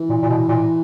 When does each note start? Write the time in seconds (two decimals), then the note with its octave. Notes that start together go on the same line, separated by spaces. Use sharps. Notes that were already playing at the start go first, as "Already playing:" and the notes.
Already playing: E3
0.09 A#2
0.22 A#2
0.30 B2
0.48 A#2